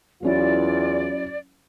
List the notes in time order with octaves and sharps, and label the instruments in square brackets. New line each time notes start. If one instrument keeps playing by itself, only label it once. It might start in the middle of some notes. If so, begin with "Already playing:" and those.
[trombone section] E2 F4 [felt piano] F#3 C#4 E4 [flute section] D5